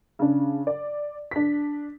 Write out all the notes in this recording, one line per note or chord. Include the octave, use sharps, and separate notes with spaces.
C#3 D4
D5
D4 B6